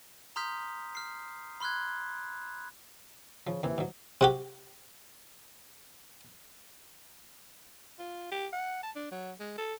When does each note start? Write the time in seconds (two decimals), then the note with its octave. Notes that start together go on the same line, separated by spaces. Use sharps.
0.36 A#5 C6 D#6 F6 G6 B6
0.95 F6 C7
1.60 B5 C6 F6 F#6 G#6
3.47 C#3 F3
3.63 D#2 C3 E3
3.78 G#2 F#3
4.21 C3 F#4 G4
7.99 F4
8.32 G4
8.53 F#5
8.83 A5
8.95 D4
9.11 F#3
9.40 G#3
9.58 A4